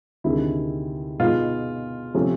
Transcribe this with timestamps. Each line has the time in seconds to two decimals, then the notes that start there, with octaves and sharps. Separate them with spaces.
0.24 D2 C3 D#3 G#3 E4
1.19 B2 G#3 B3 D#4 F4
2.14 C3 F3 A3 C#4